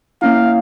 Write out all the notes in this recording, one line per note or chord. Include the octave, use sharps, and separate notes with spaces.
A#3 C#4 E4 F5